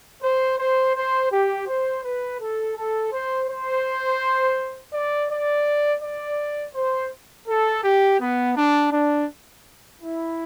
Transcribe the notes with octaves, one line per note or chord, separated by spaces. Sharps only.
C5
C5
C5
G4
C5
B4
A4
A4
C5
C5
D5
D5
D5
C5
A4
G4
B3
D4
D4
E4